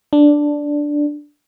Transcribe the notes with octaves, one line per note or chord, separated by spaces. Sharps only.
D4